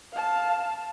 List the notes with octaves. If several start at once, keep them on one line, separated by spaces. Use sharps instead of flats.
F5 A5